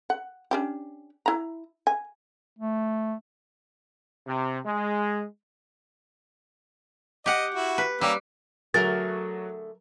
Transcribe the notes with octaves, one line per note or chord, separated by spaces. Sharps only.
F#5
C#4 D4 G4
E4 A#5
G#5
A3
C3
G#3
G4 D#5 F#5
E4 F#4
B4
G3 A#3 C#4 E6
D3 F#3 A3 F#4 G#4 A#4 A6